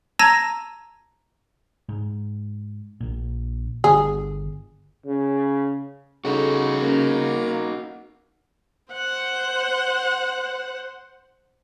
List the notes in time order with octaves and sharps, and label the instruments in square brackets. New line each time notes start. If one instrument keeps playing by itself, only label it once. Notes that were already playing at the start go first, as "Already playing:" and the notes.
[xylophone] A5 A#5 E6 G#6 A#6 D#7
[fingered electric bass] G#2
A#1 A#2
[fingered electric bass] G1 D3 B3 [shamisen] G#4
[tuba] C#3
[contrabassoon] C#3 [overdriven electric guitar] D#4 F#4 [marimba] A4 F#5
[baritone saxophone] A#3 [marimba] C#4
[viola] C5 F#5